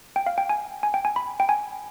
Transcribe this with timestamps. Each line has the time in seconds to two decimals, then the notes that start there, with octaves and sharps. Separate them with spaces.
0.16 G5
0.26 F5
0.38 G5
0.49 G#5
0.83 G#5
0.94 G5
1.05 G#5
1.16 B5
1.40 G5
1.49 G#5